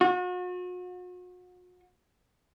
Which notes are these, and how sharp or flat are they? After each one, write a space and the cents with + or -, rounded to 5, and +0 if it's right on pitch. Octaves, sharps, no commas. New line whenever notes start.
F#4 -40